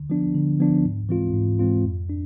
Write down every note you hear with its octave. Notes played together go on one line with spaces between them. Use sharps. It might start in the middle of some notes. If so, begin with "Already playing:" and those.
Already playing: D3
F3 B3 D4
D3
F3 B3 D4
G#2
E3 G#3 C4 F4
G#2
E3 G#3 C4 F4
F2
D4